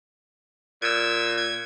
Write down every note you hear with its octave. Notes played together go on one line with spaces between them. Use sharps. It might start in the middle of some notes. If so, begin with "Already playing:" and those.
A#2 E6 G#6
G#6